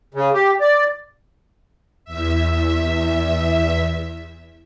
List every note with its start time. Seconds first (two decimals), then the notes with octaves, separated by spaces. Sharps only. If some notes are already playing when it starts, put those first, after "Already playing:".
0.14 C#3
0.34 G4
0.61 D5
2.04 E2 E5